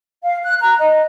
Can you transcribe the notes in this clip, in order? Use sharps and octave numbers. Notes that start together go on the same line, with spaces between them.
F5
F#6
A#5
D#5